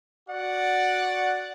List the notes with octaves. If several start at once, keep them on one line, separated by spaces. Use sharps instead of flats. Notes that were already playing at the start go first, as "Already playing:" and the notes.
F#4 D5 F#5